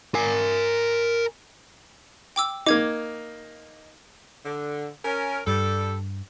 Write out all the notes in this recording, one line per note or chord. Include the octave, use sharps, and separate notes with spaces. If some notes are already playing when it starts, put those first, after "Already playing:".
A#4 G#5
G5 D6 E6
A#3 D#4 D6 G#6
D3
C#4 A#4
G2 G3 A4